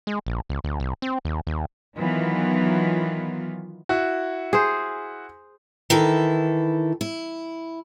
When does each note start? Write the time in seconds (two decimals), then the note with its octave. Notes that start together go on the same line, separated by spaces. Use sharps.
0.07 G#3
0.27 A#1
0.49 C#2
0.64 D2
0.80 C2
1.02 C4
1.25 D#2
1.47 D#2
1.98 D#3 E3 F#3 B3 F4
3.89 E4 F#4
4.53 G#4 C5
5.90 D#3 E3 E4 A4
7.01 E4